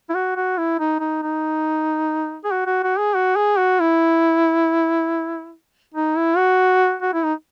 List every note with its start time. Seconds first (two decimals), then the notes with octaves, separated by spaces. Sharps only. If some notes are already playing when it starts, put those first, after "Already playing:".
0.09 E4
0.14 F#4
0.36 F#4
0.58 E4
0.79 D#4
1.00 D#4
1.22 D#4
2.44 G#4
2.51 F#4
2.66 F#4
2.83 F#4
2.98 G#4
3.15 F#4
3.36 G#4
3.58 F#4
3.80 E4
5.94 D#4
6.17 E4
6.37 F#4
7.02 F#4
7.13 E4
7.24 D#4